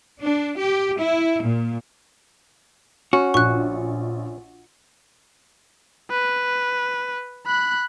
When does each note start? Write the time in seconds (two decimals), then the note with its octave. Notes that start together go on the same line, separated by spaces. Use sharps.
0.20 D4
0.57 G4
0.99 E4
1.43 A#2
3.13 C#4 F#4
3.34 A#1 C#6 F#6
6.11 B4
7.46 B5 F#6